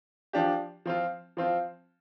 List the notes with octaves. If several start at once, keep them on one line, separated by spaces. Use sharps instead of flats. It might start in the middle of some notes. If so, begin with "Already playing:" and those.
F3 D4 G4
F3 C4 F4
F3 C4 F4